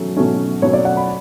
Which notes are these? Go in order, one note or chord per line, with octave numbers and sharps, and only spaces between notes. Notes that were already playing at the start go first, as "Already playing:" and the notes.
Already playing: B2 F#3 A3 C#4
B2 F#3 A3 C#4
B2 F#3 A3 C#4 C#5
D5
F#5
B5